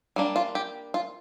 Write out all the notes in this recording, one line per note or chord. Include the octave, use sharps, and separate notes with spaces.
G3 A#3 D4
F4
G4
F4